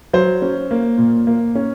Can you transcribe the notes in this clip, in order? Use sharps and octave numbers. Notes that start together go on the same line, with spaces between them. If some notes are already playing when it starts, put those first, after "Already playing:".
F#3 C5
C#4
A#3
A#2
A#3
C#4